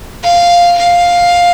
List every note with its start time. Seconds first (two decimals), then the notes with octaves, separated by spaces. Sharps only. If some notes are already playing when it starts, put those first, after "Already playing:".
0.23 F5
0.77 F5